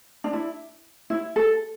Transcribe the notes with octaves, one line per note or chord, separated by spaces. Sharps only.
D4
E4
E4
A4